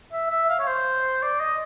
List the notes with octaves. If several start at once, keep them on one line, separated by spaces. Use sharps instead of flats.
E5
E5
F5
C#5
C5
D5
D#5